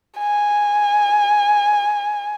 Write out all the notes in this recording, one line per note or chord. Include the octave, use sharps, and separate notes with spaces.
G#5